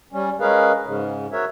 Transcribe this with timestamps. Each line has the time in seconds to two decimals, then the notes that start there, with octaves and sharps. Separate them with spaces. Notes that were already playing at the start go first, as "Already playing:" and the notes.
0.12 G3 C#4
0.40 G#3 C#4 G#4 A#4 B4 F5
0.85 G#2 C#3
1.32 F#4 A#4 C#5 E5